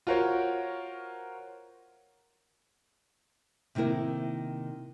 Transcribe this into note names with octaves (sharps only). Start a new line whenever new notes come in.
F4 F#4 A#4 C5 C#5
C3 D#3 A#3 E4 A#4